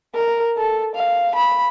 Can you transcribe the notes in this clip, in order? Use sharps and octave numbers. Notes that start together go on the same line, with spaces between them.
A#4
A4
F5
B5